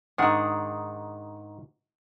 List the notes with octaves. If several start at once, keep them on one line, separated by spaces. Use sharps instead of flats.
G#2 D#3 D4 G#4 F#5